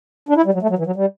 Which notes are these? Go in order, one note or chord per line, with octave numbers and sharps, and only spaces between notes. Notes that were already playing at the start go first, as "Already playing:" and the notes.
D4
E4
G3
F#3
A3
F#3
E3
F#3
G3